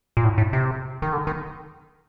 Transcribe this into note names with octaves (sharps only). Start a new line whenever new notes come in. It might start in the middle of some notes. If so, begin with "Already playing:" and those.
A#2
A2
A2
C3
D#3
D3
D#3